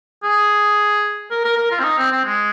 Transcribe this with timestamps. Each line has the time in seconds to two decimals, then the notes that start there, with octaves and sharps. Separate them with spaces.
0.24 G#4
1.31 A#4
1.45 A#4
1.57 A#4
1.71 F4
1.80 C4
1.84 D#4
1.98 C4
2.11 C4
2.25 G#3